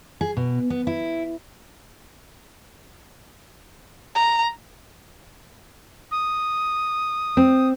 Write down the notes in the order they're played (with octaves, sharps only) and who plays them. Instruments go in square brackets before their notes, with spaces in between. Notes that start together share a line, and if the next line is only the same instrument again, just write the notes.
[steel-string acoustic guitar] G#4
B2
B3
E4
[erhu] A#5
[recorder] D#6
[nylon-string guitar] C4